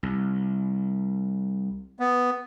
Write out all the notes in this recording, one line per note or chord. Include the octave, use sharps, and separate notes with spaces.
C2
B3